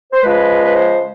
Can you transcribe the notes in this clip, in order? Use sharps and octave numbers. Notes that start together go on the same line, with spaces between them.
C5
C#3 F3 G#3 B4
B4
C5